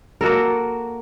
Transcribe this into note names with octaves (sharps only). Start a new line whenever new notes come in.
A#3 F#4 A4 A#4